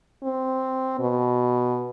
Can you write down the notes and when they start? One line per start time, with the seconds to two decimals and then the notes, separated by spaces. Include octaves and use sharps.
0.23 C4
0.99 B2